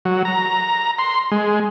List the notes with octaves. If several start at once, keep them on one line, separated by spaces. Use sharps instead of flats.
F#3
A#5
C6
G#3